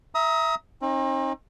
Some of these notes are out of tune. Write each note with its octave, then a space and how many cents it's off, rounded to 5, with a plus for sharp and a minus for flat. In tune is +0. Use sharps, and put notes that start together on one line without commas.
E5 +0 A#5 +10 D#6 +30
C4 +45 D#4 +0